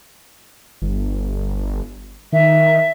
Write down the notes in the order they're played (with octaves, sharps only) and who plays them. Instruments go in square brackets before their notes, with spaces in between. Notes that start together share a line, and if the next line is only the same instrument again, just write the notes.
[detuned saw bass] G1
[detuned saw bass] D#3 [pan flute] E5